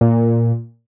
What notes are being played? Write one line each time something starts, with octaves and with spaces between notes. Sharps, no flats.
A#2